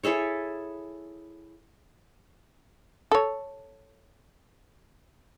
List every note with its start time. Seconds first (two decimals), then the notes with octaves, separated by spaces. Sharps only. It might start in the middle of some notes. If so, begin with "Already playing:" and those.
0.04 E4 G#4 A4 C#5
3.11 A4 C#5